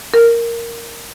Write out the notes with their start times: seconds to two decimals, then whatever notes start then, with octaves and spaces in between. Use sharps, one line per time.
0.14 A#4